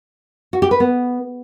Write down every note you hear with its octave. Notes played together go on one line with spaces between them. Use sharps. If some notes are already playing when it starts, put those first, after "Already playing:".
F#4
G4
B4
B3